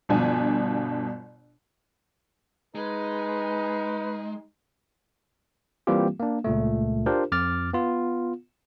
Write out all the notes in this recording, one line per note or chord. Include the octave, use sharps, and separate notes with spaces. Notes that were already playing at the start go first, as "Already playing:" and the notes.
G1 B2 F3 D4 G#5
G#3 D#4 B4
E3 G3 A#3 C4 F4 G4
A#3 D4
C#2 A#2 A3
D4 F4 G4 A#4 C5
F2 D6 F6 A6
B3 F4